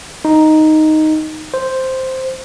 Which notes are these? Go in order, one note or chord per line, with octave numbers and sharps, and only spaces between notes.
D#4
C5